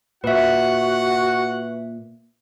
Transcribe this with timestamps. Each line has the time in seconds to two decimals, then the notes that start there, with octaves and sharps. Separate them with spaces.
0.24 A#2 F#4 B4 E5 F#5